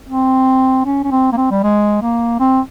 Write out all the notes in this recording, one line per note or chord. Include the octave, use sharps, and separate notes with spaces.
C4
C#4
C#4
C4
A#3
C4
G3
G#3
A#3
C4